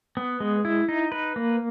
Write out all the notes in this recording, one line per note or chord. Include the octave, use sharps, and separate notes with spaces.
B3
G#3
E4
D#4
B4
A#3